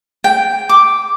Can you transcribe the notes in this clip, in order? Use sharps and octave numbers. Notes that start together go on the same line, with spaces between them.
G5
D6